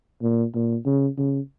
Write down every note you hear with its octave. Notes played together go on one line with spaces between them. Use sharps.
A#2
A#2
C#3
C#3